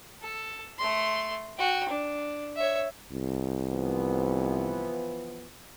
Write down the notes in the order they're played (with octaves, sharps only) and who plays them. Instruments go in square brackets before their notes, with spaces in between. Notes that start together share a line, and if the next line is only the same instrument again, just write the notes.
[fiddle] A4
A3 C6
F#4 G5
D4
C#5 E5
[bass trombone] C2
[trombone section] E3 F3 B3